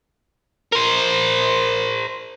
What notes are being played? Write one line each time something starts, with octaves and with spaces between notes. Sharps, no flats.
A#4 C5